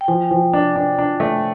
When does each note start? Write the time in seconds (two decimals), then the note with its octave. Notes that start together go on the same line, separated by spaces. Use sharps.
0.01 G5
0.08 F3 G#5
0.31 F3
0.53 D4
0.76 D4
0.98 D4
1.20 A3